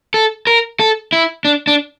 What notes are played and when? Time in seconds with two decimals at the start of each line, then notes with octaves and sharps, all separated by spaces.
0.14 A4
0.47 A#4
0.80 A4
1.12 E4
1.45 D4
1.67 D4